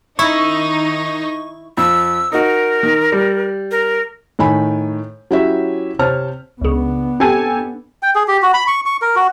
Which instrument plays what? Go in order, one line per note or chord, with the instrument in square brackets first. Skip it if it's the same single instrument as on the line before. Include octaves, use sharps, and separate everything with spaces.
[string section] D#3 D#4 [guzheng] E4 [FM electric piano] C#6
[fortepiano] F2 [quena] E6
[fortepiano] D#4 F#4 [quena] A#4
[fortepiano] D#3
G3
[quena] A#4
[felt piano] A2 D#3 G#5 B5
F#3 C#4 E4 F#4 G4 E5
C3 C5 C#5 A5 F6
[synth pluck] C#2 C#3 [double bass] B3 D4
[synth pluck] C4 [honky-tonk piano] G4 A4 G#5
[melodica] G5
G#4
G4
F#4
B5
C#6
C#6
A#4
F#4